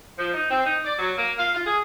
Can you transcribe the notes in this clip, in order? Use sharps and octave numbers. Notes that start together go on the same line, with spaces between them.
F3
D#4
C4
D#4
D5
F#3
A#3
F5
F4
G#4